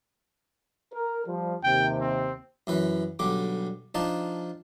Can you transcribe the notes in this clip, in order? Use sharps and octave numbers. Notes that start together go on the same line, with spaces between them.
A#4
F3 G3
D#2 C3 G5
C4
F#2 E3 B4
B1 D3 G3 D6
F3 D4 D#4 A5